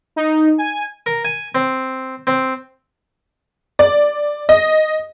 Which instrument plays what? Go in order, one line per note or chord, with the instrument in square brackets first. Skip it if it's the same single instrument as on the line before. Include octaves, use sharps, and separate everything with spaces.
[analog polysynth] D#4
G#5
[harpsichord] A#4
G#5
C4
C4
[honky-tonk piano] D5
D#5